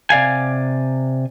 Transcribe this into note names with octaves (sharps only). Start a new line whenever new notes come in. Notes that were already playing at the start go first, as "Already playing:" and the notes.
C3 D5 F5 G#5